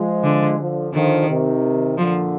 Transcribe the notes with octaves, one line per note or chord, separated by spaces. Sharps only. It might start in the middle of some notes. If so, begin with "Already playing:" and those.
Already playing: F3 G#3
D3
D3 F3
D3 D#3 F3
C3 D#3
A#2 D3 F3